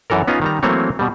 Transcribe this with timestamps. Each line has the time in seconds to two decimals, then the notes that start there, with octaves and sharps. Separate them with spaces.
0.10 F#2 E3 A4 A#4
0.27 B3 C#4 D#4 F4 G#5 A#5
0.42 D#3 G3 A#5
0.63 E3 F#3 A3 A#3 C4 C#5
0.99 B2 G3